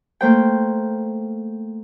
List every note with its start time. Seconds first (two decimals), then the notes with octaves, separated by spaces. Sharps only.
0.21 A3 A#3 C5 G5